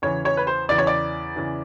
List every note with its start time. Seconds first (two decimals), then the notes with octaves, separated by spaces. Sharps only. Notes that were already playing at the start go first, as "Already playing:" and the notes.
0.02 E2 C#3 E3 C#5
0.25 C#5
0.37 B4
0.47 C5
0.69 E2 C#3 E3 D5
0.78 C#5
0.87 D5
1.36 E2 C#3 E3